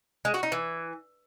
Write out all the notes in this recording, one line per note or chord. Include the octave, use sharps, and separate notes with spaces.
G#3
F#4
D#4
E3